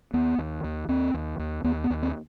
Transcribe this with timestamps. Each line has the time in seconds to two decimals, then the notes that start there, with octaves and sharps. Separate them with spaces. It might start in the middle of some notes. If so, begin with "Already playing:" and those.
0.13 D#2 B3
0.38 D#2
0.64 D#2
0.88 D#2 C4
1.14 D#2
1.39 D#2
1.64 D#2 B3
1.84 B3
1.90 D#2
2.03 C4